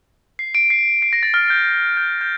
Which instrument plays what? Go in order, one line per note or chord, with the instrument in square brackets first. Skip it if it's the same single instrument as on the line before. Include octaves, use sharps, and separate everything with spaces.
[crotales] C7
D7
C7
C7
A#6
A6
F6
G6
G6
G6